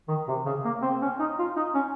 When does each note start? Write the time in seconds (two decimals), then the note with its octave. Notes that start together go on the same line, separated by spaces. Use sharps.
0.08 D#3
0.28 C3
0.46 C#3
0.65 A#3
0.82 C4
1.02 C#4
1.19 D#4
1.39 F4
1.56 D#4
1.75 C#4